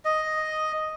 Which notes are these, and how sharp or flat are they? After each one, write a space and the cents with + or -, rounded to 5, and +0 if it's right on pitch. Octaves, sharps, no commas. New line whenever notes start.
D#5 +0